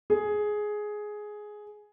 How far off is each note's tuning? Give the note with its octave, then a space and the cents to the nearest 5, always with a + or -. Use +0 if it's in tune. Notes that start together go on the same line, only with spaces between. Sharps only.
G#4 +10